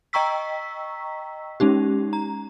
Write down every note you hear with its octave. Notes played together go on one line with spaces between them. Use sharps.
D#5 G5 A#5 C#6 E6 B6
G#3 C#4 D#4 G4
A#5